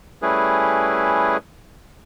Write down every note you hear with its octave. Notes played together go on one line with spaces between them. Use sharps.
G3 A3 C#4 E4 G#4 B4